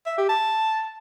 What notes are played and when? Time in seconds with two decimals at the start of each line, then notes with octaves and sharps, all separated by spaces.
0.06 E5
0.18 G4
0.29 A5